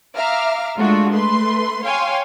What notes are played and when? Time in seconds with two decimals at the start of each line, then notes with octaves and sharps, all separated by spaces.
0.16 E5 F5 A#5 D6 F6
0.77 G#3 A3 D4 F4 F#4
1.11 A3 B4 C6
1.84 C#5 F5 G5 G#5 C6 C#6